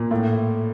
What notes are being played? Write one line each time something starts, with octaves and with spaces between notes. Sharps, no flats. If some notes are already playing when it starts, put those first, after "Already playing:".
Already playing: A#2
A2